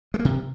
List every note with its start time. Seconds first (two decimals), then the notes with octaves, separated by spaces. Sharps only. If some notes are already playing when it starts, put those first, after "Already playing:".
0.14 G#3
0.19 A#3
0.25 C3